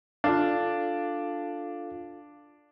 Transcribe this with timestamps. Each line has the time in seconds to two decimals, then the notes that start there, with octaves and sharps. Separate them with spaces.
0.24 D4 F4 A4 F5